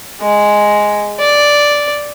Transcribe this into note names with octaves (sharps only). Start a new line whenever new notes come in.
G#3
D5